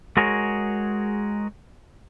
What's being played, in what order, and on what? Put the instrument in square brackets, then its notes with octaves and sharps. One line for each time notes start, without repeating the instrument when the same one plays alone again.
[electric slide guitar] G#3 F#4 G#4 A#4 C#5